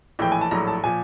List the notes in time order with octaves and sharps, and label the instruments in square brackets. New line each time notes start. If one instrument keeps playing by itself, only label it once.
[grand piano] A#1 A2 E3 G5
G#5
A5
A#1 A2 F#3 A#5
A5
A#2 F3 G#5